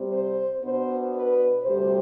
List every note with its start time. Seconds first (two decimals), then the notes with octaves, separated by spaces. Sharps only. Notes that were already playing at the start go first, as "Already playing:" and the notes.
Already playing: C3 G3 C4
0.11 C5
0.62 B2 B3 D4 C5
1.13 B4
1.63 D2 C3 G3 C5